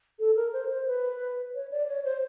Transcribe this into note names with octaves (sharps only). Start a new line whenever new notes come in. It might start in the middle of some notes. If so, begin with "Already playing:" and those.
A4
A#4
C5
C5
B4
C#5
D5
C#5
C5